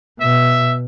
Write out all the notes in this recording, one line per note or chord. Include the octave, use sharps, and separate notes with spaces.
B2 E5